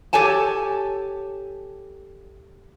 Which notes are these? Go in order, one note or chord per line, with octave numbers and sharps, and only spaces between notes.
G4 A4 C#5 G#5 A5